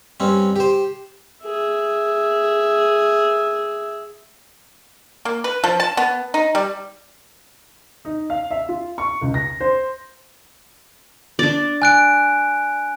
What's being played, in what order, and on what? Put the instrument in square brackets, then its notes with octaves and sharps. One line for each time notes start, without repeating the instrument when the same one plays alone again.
[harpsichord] G2 C4 C#4
G4 C5
[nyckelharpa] G#4 E5
[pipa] A#3
B4
F3
A5
B3
D#4
G3
[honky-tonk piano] D#4
F5
E5
F4
C#6
C#2
A#6
C5
[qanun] D4 D5
[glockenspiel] G#5 F#6 D7